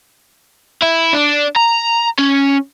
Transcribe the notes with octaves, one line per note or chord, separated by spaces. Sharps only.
E4
D4
A#5
C#4